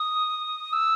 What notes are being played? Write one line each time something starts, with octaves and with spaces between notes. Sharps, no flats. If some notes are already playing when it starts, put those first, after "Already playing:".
Already playing: D#6
E6